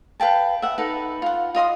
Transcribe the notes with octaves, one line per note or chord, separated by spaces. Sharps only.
B4 F5 G5 A5
E5 F#5
D#4 A4 B4
F4 F#5
F4 D#5 C6 D#6